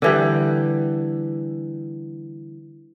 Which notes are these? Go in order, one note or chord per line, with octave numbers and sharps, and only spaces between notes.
D3 E3 G3